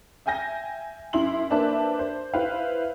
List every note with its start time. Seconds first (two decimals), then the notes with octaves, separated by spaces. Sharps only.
0.26 E5 G5 G#5 G6 A#6
1.13 F#2 E4 C6 F#7
1.50 A#3 D4 B4 C5 E5 A5
1.99 C5
2.34 E4 B4 C5 E5 F5